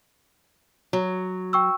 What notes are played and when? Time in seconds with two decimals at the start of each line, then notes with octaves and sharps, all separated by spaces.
0.93 F#3
1.53 G5 C#6 E6